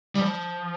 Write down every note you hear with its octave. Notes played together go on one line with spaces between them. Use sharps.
G3
F3